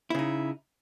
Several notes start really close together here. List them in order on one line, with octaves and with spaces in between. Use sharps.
E4 C#3 D#4